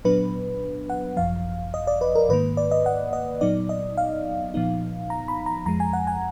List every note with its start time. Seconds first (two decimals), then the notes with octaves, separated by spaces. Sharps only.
0.05 A#2 F#3 B3 D4 B4
0.90 F#5
1.17 G#1 F#2 F3 F5
1.74 D#5
1.87 D5
2.01 B4
2.15 A#4
2.29 G#2 D#3 A#3 B4
2.57 D5
2.71 D#5
2.86 F#5
3.13 D#5
3.41 A#2 F#3 B3 D#4 D5
3.69 D#5
3.97 F5
4.54 A#2 F3 B3 D#4
5.10 A#5
5.28 B5
5.46 A#5
5.66 F2 F3 G#3 A#5
5.80 G#5
5.93 F#5
6.07 G#5